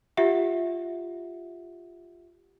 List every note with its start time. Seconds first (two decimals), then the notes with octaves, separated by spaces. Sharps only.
0.17 F4 G4 E5 F#5